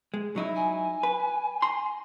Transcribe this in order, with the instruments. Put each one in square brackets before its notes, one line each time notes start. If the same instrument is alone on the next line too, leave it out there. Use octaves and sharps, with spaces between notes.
[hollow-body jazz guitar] G#3
F#3 D#4 E4
[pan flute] G#5
[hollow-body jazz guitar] B4
A#5 C6